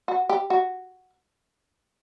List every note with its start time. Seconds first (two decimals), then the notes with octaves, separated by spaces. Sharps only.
0.08 F#4
0.29 G4
0.50 F#4